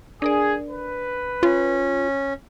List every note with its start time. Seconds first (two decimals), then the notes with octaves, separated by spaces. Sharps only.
0.22 D4 G#4 A#4 D5
0.70 B4
1.43 C#4 F4